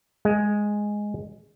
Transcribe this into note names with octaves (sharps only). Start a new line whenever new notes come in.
G#3